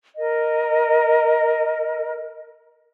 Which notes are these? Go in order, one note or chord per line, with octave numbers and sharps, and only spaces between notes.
A#4 D#5